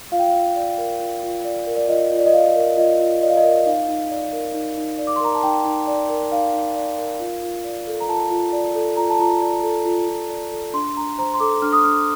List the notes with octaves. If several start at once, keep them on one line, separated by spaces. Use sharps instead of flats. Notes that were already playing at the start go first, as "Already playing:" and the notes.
F4 F5
G5
F5
F4
D5
A#4
F4
F4
D5
A#4
D5
F4 D#5
F4
D5
D#5
D5 F5
A#4
F4 D#5
F4
D5 D#5
F5
D#5
A#4
D#4 F5
D#4
D5
A#4
D#4
D#4
D5
D6
C6
A#4 A#5
A5
D#4 G5
D#4
D5
A#4
D#4 F5
D#4
D5
A#4
F4
F4
D5
A4
A#5
F4 A5
F4
D5
A4
F4 A#5
A5
F4 A#5
D5
A4
F4
F4
D5
A4
D4 C6
D4 A#5
C5 A#5
C6
A4 D6
D4 F6
D#6
D4 F6